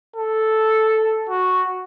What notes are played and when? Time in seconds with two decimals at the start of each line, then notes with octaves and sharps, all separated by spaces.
0.16 A4
1.29 F#4